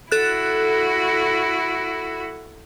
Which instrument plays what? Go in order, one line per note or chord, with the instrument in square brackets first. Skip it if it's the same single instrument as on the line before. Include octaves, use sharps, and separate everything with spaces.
[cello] E4 F#4 [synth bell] A4 F#6